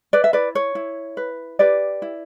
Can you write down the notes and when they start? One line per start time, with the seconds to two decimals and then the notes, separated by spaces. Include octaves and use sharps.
0.13 B4 D5
0.24 E5
0.33 E4 B4 D5
0.55 C#5
0.75 E4
1.17 B4
1.59 G4 B4 D5
2.02 E4